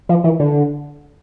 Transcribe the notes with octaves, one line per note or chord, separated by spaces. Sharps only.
F3
E3
D3